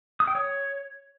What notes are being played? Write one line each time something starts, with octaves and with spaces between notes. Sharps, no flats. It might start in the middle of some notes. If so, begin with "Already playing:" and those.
D#6
G5
C#5